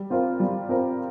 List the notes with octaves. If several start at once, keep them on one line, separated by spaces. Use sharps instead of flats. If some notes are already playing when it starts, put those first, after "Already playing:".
Already playing: G3
C4 F4 A#4
G3
C4 F4 A#4